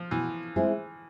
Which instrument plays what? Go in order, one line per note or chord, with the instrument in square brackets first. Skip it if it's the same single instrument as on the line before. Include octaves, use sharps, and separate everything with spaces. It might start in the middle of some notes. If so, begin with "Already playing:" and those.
Already playing: [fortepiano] F3
[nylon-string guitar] B2 [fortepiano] E3
[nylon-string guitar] G#3 C4 E4 G#4